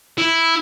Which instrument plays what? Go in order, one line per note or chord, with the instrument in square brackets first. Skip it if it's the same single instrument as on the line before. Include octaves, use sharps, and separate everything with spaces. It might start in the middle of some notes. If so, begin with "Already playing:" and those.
[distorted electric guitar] E4